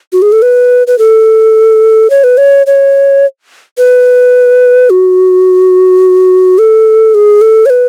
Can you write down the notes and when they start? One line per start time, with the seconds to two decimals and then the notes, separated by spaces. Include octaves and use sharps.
0.13 F#4
0.22 G#4
0.32 A4
0.42 B4
0.87 B4
0.99 A4
2.10 C#5
2.24 B4
2.38 C#5
2.67 C#5
3.78 B4
4.90 F#4
6.58 A4
7.14 G#4
7.41 A4
7.66 C#5
7.70 B4